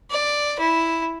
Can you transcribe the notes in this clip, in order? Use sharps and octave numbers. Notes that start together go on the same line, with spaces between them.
D5
E4